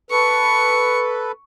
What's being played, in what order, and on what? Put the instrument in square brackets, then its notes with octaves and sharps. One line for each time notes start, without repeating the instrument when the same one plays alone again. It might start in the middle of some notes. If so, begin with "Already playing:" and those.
[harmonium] A4 B4 [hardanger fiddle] C#6